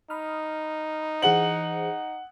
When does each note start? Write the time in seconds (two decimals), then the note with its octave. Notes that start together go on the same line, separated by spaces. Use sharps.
0.10 D#4 B5 D#6 F6
1.22 E3 G#4 C5 F#5 F#7